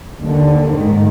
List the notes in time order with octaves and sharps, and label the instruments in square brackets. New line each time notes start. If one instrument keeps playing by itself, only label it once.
[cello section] D#2 D3
G#2 D#3